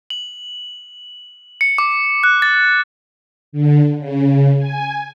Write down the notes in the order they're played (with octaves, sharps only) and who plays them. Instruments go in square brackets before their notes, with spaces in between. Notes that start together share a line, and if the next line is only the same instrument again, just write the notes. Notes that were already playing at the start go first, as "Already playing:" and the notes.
[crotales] F#7
C#7
D6
F#6
A6
[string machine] D3
C#3
G#5